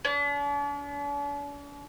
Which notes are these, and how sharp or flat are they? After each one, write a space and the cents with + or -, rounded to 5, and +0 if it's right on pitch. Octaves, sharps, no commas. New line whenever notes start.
D4 -45